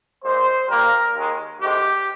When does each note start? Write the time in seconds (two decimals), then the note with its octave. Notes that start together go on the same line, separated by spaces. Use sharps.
0.23 A#2 G#3 C5
0.68 A#2 G3 A#3 A#4
1.13 D#2 D#3 G#3
1.59 D2 C3 D#3 G#3 G4